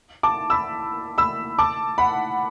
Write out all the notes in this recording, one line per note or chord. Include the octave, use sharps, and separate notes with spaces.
A5 D6
B5 E6
B5 E6
A5 D6
F#5 B5